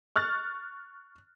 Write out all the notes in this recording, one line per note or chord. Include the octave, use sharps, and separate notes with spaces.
C#6 F6 F#6 A6